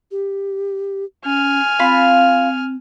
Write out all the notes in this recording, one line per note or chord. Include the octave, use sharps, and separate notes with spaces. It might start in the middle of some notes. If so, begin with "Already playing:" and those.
G4
C#4 G#5 F6
C4 F4 B5